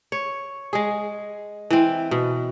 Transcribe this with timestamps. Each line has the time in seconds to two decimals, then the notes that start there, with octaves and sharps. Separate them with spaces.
0.12 C#5
0.73 G#3 G#4
1.70 E3 C4
2.11 B2